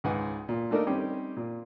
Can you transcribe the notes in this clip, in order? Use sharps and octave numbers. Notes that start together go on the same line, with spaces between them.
C#2 G#2 B4 F#5 G#5
A#2
A3 A#3 D4 D#4 A4 A#4
G3 C4 C#4 D#4 G4
A#2